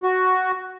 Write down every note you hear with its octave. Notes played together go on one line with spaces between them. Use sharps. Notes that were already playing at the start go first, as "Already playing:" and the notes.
F#4